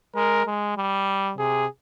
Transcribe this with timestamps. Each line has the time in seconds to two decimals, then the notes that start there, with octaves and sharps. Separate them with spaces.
0.15 G#3 A#4
0.46 G#3
0.77 G3
1.38 C3 G#4